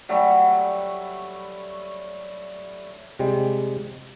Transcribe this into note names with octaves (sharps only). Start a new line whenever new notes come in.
F#3 G3 A3
C3 G3 G#3